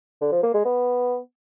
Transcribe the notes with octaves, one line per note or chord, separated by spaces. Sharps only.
D3
F3
A#3
G#3
B3